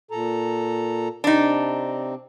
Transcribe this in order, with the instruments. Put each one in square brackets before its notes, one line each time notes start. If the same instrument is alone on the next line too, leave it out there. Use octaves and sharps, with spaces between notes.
[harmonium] A#2 A4 A#5
[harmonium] C3 C4 [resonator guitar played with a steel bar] D4 D#4